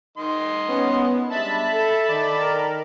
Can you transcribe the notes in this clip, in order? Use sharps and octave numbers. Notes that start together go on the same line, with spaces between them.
D#3 D#5 C6
B3 C#4
G3 G#3 D4 E5 A5 B5
A4
D#3 A4 D5
A#4